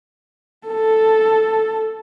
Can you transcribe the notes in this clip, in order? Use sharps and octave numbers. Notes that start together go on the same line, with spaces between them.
A4